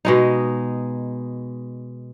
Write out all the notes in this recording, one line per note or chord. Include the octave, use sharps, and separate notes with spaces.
B2 G#3 D#4